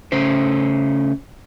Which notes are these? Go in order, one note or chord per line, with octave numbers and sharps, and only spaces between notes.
C#3 A3 C#4 C5